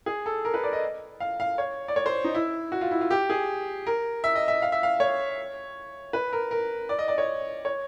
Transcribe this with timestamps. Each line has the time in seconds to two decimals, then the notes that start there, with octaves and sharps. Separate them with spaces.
0.06 G#4
0.26 A4
0.45 A#4
0.54 B4
0.64 D5
0.73 D#5
1.20 F5
1.40 F5
1.58 C#5
1.88 D5
1.96 C#5
2.06 C5
2.24 D#4
2.35 E4
2.72 F#4
2.81 F4
2.91 E4
3.01 F4
3.11 G4
3.30 G#4
3.87 A#4
4.24 E5
4.35 D#5
4.48 E5
4.62 F5
4.72 E5
4.83 F5
5.00 C#5
6.13 B4
6.33 A#4
6.51 A#4
6.89 D5
6.99 D#5
7.08 D5
7.18 C#5
7.65 C#5